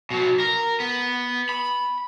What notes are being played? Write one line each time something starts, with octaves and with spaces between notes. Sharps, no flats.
B2 F#3
A#4
B3
B5